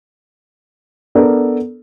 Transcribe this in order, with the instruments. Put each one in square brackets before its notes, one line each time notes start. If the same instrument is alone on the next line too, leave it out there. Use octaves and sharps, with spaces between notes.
[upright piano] B3 D4 A4 A#4 D5